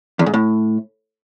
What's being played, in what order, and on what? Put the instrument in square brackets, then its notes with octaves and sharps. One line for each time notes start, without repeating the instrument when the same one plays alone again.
[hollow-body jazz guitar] E2
G#2
A2